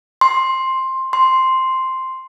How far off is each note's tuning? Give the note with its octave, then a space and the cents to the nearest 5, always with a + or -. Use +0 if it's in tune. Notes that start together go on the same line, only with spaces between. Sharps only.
C6 +10
C6 +0